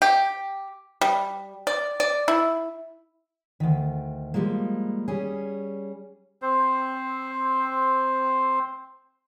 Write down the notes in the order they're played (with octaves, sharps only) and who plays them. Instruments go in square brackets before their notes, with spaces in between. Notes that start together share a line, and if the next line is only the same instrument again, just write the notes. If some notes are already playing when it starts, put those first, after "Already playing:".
[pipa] G4
G3
D5
D5
E4
[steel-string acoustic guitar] D2 D#3
F3 G3 G#3 A#3
G3 C#4 G#4
[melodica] C4 C5